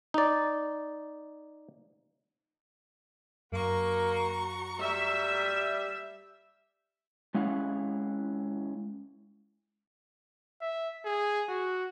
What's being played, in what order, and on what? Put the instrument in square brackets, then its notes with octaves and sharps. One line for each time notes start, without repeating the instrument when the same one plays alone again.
[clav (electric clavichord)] D#4 D5
[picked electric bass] F#2 [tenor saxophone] A#3 [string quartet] F#4 A#5 C#6
[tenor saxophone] G3 [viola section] E5
[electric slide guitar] G#3 C#4 E4 F5 F#5
[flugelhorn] E5
G#4
F#4